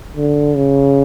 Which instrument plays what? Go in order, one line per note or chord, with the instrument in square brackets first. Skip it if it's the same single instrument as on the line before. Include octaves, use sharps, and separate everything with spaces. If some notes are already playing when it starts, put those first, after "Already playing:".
[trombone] D3
C#3